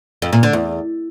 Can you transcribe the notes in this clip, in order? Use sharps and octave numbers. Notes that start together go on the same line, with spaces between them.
F2
A#2
D3
E2